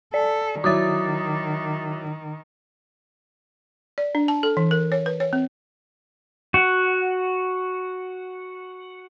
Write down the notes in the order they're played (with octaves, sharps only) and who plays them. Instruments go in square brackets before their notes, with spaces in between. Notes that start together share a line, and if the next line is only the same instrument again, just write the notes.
[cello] A4 [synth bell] D5
[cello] D#3 [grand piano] F#3 E4 [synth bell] D6 D#6 A6
[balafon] D5
D4
A5
A4
E3
A#4
C#5
B4
C#5
C4
[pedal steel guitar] F#4 F#5